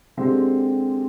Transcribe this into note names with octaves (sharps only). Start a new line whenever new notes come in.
D3 G#3 C4 G4